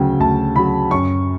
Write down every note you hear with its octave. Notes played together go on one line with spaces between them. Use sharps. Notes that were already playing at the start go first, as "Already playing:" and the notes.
Already playing: D2 C#3 F#3 G5
D2 A5
C#3 F#3 B5
F#2 C#6